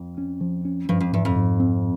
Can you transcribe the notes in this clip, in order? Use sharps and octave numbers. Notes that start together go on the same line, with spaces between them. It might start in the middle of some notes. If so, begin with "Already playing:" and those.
Already playing: F2
C#4
F3
C#4
G2 F3
F2
E2 G#2
F2
G#2
C4